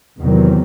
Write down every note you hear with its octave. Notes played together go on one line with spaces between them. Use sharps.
E2 C3 D#3 F#3